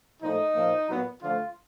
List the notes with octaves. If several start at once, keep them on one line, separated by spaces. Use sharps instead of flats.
A#2 F3 A3 D#4
A#2 F3 A#3
A#2 F#3 B3
D3 F3 A3 F4